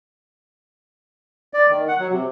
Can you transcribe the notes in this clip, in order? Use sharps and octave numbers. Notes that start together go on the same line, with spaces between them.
D5
D#3
F#5
F#3
C3